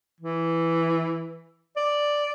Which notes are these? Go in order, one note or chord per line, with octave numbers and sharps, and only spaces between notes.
E3
D5